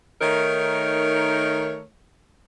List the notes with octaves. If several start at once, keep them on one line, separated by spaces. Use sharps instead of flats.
D#3 A3 D#4 A#4 C#5